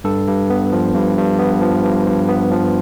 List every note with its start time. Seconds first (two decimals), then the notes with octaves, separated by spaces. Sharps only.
0.04 G2 A4
0.28 G2
0.50 B3
0.72 F3
0.94 G2
1.18 G2
1.39 B3
1.61 F3
1.84 G2
2.07 G2
2.29 B3
2.51 F3